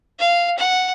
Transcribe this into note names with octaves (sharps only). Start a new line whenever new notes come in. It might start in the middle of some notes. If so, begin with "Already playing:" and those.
F5
F#5